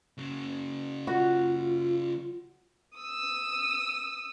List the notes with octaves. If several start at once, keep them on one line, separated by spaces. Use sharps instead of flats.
C#3 F#3
F4 F#4
D#6 E6